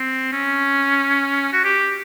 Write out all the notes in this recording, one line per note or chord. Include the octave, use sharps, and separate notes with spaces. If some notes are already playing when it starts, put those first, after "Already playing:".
Already playing: C4
C#4
F#4
G4